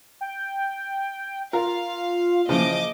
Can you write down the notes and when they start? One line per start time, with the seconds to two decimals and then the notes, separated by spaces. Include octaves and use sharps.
0.21 G5
1.53 F4 A#4 F5
2.49 C#3 E3 F3 A#3 D#5 D6